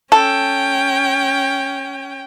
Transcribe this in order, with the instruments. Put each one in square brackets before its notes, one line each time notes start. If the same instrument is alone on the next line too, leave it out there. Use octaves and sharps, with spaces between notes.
[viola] C#4 G5 [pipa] A4